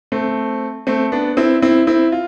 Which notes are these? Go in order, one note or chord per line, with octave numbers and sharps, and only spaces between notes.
A3 C4
A3 C4
B3 D4
C4 E4
C4 E4
C4 E4
F4